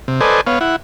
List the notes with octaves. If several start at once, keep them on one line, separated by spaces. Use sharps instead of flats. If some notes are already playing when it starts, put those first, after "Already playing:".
C3
A4 B4 C5 D5 D#5 G#5
B3 C#5 F5
E4 F#5